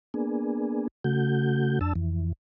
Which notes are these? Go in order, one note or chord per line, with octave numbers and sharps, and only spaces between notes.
A#3 B3 D4 G#4
C#3 A3 F#4 G6
F2 D4 A5 E6
F2 E3